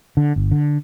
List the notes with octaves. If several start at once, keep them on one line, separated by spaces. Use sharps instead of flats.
D3
G1
D3